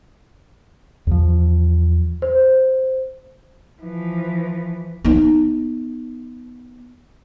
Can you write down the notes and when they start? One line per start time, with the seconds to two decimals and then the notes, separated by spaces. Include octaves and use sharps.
1.07 E2 F3
2.22 C5
3.82 E3 F3
5.05 B3 D#4